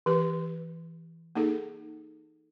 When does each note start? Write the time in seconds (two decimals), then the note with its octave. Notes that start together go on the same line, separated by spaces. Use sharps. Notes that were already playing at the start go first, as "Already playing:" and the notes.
0.06 E3 G4 B4
1.35 A#3 D#4 G#4 A4